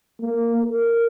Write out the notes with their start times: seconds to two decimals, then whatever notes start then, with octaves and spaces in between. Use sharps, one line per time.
0.22 A#3
0.64 A#4